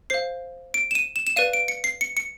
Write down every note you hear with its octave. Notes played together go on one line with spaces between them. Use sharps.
C5 F5 C7
D7
E7
D#7
E7
E7
B4 D5 F5 D#7
D7
C#7
C7
C#7
C#7